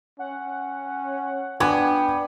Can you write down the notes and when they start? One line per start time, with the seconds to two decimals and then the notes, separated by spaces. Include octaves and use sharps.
0.19 C#4 F#5
1.60 B3 D4 G5 G#5 D6 G#6